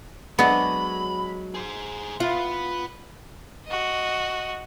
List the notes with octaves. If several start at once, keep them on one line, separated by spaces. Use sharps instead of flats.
F#3 G#3 B3 D4 B5
G#4 C5
F4 B4 F#5
F#4 D#5